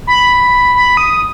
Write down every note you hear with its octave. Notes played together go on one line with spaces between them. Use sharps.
B5
B5
D#6